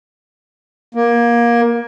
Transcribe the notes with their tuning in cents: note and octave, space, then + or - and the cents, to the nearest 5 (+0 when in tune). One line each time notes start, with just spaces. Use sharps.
A#3 +20